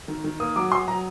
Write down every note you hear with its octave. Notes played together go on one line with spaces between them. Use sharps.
D#3
D#3
A#3 D#6
F#3 D6
F#3 C6
F#3 A#5